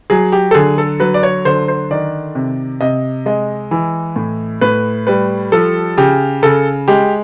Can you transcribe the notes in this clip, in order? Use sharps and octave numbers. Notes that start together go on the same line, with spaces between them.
F#3 G#4
G4
A4
D3 G#4
A4
F#3 B4
D5
C#5
D3 C5
C5
D#3 D5
C3
C3 D#5
G#3 D#5
E3
A2
A2 B4
G3 B4
F3 A4
C#3 G4
C#3 A4
G#3 G4